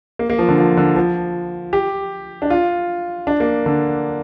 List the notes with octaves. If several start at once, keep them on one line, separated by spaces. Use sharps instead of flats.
A#3
A#3
F3
D3
F3
D3
F3
G4
D4
F4
D4
A#3
D3